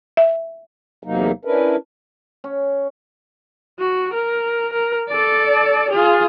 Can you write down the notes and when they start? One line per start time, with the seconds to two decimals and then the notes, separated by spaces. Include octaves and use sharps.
0.17 E5
1.03 E2 C3 F#3 A#3 D#4
1.45 C#4 D4 E4 A#4 B4
2.44 C#4
3.79 F#4
4.13 A#4
4.73 A#4
5.09 A4 D5
5.90 F4 G#4